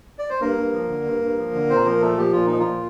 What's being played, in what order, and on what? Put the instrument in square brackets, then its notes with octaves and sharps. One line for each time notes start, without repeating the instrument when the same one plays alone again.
[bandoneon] D5
C5
G2 A#3 A#4
G2
F3
D3
G2
G2
F3
D3
A#2 C4 C5
F3 A#3 A#4
A#2 A3 A4
F3 G4
A#2 F4
F3 D#4
F3 F4
A#2